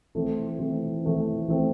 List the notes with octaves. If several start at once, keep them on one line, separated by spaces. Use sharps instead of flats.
E3 A3 C4 A4
E3 A3 C4
E3 A3 C4
E3 A3 C4